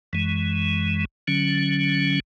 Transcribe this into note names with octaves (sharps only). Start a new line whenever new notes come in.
F#2 E3 G#3
D3 F#3 C#4